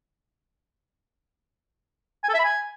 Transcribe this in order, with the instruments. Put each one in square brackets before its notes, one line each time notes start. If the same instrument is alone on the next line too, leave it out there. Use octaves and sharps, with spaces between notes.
[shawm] G#5
A4
E5
B5
G#5